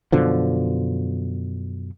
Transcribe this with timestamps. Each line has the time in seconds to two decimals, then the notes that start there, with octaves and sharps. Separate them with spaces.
0.12 F#2 B2 D3 F3